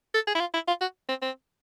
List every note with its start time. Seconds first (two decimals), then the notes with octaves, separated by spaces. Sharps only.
0.14 A4
0.27 G#4
0.35 E4
0.40 F4
0.54 E4
0.67 F4
0.81 F#4
1.09 C4
1.22 C4